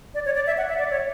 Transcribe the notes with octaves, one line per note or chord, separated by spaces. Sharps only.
D5
C#5
D5
E5
F#5
E5
D5
C#5